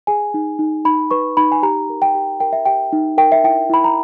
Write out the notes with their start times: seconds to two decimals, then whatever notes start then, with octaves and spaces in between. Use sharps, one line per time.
0.07 G#4 G#5
0.34 D#4
0.59 D#4
0.85 D#4 B5
1.11 B4 C#6
1.37 D#4 B5
1.52 G#5
1.63 G4 A#5
1.89 A#4
2.02 G5
2.15 G4
2.40 A#4 G5
2.53 E5
2.66 G4 G5
2.93 D#4
3.18 A#4 G5
3.32 E5
3.44 E4 G5
3.70 E4 B5
3.84 A#5